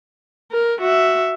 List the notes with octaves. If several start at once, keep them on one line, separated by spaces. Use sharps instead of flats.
A#4
F#4 E5